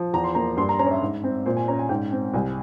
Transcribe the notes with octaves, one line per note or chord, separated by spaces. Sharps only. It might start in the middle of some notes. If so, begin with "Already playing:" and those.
Already playing: F3
E2 A#5
C6
A#3 A#5
G2 C6
A#5
C#4 A#5
C#5
E5
G#2
C4
A#2 C5
G#5
C#4 A#5
G#5
G#2 G5
C4
C2 G#5